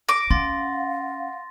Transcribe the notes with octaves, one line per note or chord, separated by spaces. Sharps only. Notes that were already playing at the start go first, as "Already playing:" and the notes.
D6 A#6
C#4 F5 F#5 C6 A6 A#6